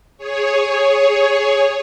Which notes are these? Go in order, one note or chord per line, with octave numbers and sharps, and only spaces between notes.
G#4 C#5